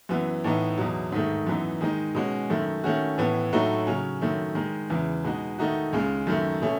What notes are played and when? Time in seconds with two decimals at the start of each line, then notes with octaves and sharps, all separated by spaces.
0.09 F#2 E3 B3
0.44 A2 E3 B3 D#4
0.78 E2 B2 F#3
1.12 G#2 D#3 A3
1.47 F#2 E3 B3 D#4
1.81 D#3 G#3 D#4
2.15 B2 G#3 C#4 F#4
2.50 F#2 D#3 A3
2.84 D#3 A3 C#4 F#4
3.18 A2 E3 B3
3.53 A2 F#3 A3 D#4 F#4
3.87 C#3 F#3 C#4
4.21 F#2 D#3 F#3 A3
4.55 D#3 G#3 D#4
4.90 E2 C#3 E3
5.24 B2 G#3 D#4 F#4
5.59 D#3 A3 D#4 F#4
5.93 C#2 C#3 G#3
6.27 F#2 D#3 A3
6.62 B2 A3 C#4